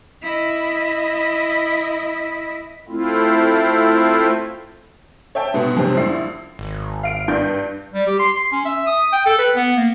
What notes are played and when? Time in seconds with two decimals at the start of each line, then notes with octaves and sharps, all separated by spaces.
0.23 E4 D#5
2.89 A3 C4 E4 F4
5.35 C#5 E5 G5 A5
5.54 G#2 B2 B3
5.77 F2 G#2 C3 C4 C#4
5.97 A#1 E4 C7
6.59 G#1
7.03 F5 D7
7.28 G2 D4 G6
7.93 G3
8.07 G4
8.19 C6
8.33 C6
8.52 C#4
8.65 E5
8.87 D#6
9.13 G5
9.26 A4
9.38 B4
9.56 B3
9.77 A#3